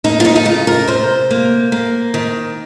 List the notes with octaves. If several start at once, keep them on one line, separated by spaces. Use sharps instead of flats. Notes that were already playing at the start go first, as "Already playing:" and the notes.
A#3 D#4
F4
D#4
D#4
C#3 F4
A#4
C3 C5
A#3
A#3
D#3